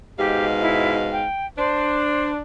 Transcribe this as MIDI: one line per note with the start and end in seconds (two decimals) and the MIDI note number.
0.18 1.24 44
0.18 1.24 47
0.18 0.45 67
0.18 1.24 77
0.61 0.94 64
1.12 1.46 79
1.57 2.42 62
1.57 2.31 72